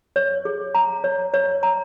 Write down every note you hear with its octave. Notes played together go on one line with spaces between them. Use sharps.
C#5
G#4
A#5
C#5
C#5
A#5